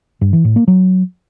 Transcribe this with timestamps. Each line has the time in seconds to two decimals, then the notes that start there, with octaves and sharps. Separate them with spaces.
0.21 G2
0.33 E3
0.44 A2
0.56 A#3
0.68 F#3